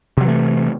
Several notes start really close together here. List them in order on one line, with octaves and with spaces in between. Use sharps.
C3 F#3 E3 A3